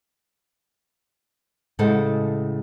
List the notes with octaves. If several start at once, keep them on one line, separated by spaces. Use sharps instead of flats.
A2 C#3 G#3 A4 C5 F#5